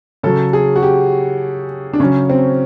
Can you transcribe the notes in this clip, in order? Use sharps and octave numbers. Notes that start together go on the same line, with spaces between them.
C#3 F#3 A4
G#4
F#4
G4
D4
C#3 F#3 C#4
C4